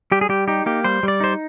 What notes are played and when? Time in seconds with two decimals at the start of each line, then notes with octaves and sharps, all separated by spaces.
0.12 G3 G4
0.21 G#4
0.29 G3 G4
0.48 D#4 G4
0.66 A#3 G4
0.84 G3 C5
1.03 G3 D5
1.20 D#4 C5